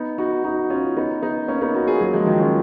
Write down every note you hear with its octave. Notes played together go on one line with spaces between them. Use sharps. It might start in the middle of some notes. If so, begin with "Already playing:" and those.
Already playing: B3 D#4
D#4 F#4
D#4 F#4
C#4 F4
B3 D#4
B3 D#4
A#3 C#4
B3 D#4
D#4 F#4
F4 G#4
F#3 A#3
F3 G#3
D#3 F#3
C#4 F4